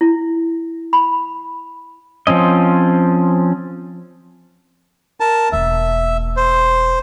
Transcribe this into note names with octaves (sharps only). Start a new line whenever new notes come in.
E4
B5
F3 C4 C#4 D#5
A#4 A5
E1 A#3 E5
C5